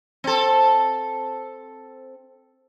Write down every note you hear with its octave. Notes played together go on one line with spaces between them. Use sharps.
C4 A4